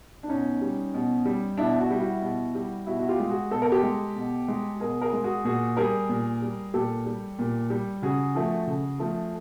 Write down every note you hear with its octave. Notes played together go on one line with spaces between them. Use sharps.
D4
B2 C#4 D#4
G3
B2
G3
B2 D4 E4
E4 F#4
G3
E4 F#4
B2
G3
B2 E4 F#4
F#4
F4 G4
G#3
F#4 G#4
B2 A4
A#4
G4 A4
G#3
B2
G#3
B2 G#4 A#4
G#4 A#4
G#3
F#4 G#4
A#2 F#4 G#4
G3 G#4 A#4
A#2
G3
A#2 G4 A4
G3
A#2
G3
C#3 F#4 G#4
F3 A3
C#3
F3 A3